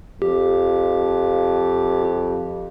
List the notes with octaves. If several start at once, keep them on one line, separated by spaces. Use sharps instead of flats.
F2 G4